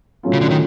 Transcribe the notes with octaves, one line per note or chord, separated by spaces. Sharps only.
A2 F#3 A3 C#4 F4
C#3
D3
D#3